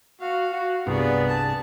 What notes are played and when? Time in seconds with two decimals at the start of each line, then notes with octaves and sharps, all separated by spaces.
0.21 F#4 F5
0.52 F#4 F5
0.87 C2 G2 B3 G#4 D5
1.28 G#4 A5